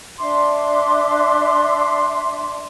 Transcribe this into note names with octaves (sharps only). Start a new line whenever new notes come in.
D4 E5 C6 D6